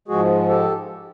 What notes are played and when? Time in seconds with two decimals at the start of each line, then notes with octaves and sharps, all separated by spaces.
0.08 G#2 F3 G#3 F#4 G#4
0.49 G4 A4